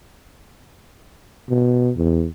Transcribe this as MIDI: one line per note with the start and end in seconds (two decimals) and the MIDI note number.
1.49 1.91 47
1.97 2.26 40